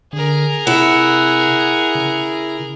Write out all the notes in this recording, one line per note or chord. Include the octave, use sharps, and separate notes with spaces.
D3 G#4 A#4
C3 E4 F#5
C#3